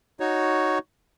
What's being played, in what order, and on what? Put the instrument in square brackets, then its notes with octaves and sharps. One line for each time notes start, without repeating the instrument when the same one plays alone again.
[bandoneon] D#4 F#4 C#5